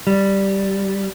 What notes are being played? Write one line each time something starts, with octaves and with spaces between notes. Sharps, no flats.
G3